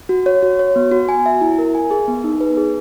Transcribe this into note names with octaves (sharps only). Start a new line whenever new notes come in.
F#4
C#5
F#4
C#5
B3
F#4
G#5
E5
E4
A#4
G#5
G#4
B3
D#4
B4
G#4